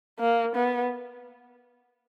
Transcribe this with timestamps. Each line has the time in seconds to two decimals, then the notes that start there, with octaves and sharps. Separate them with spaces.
0.20 A#3
0.56 B3